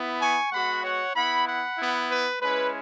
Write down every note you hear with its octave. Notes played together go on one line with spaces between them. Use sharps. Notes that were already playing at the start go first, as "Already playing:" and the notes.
Already playing: B3 E4
G#5 C#6
G#3 B3 F#4 F#5 B5
C#5 F#5
B3 E4 F#5 B5
F#5 B5
B3 E4
B4
G#3 C#4 E4 B4